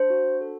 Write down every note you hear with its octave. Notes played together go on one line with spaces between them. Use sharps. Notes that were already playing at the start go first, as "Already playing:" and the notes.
Already playing: D4 C5
F#4
A4